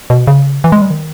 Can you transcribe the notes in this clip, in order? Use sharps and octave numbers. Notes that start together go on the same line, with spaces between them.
B2
C#3
E3
G#3
G3
D#3